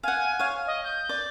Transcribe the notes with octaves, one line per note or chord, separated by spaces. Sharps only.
F5 F#5 G#5
C#5 F5
D#5
G6
D5